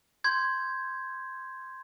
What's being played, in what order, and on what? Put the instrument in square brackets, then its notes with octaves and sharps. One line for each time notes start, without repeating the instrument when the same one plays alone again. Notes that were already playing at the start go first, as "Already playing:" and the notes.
[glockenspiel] C6 G6 G#6